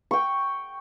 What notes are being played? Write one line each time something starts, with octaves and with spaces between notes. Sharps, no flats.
G5 C#6